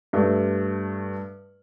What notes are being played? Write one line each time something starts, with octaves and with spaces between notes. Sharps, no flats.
G2 A3